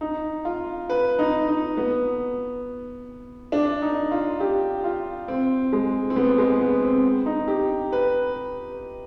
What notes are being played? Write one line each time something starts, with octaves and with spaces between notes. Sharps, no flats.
D#4
F4
B4
D#4
D#4
B3
D4
D#4
F4
G4
F4
C4
G#3
C4
B3
G#3
B3
C4
D#4
G4
B4